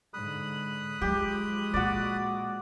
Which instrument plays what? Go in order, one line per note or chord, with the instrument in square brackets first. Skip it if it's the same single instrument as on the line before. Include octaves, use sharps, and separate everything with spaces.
[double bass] G#2 D3 [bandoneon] B5 D#6 F#6
[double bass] F3 G#3 [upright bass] F#3 [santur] G4
[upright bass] A#2 A#3 [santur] F#4 D5